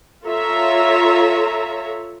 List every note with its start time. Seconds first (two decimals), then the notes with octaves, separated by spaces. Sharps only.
0.25 F4 A4 C#5 E5 A#5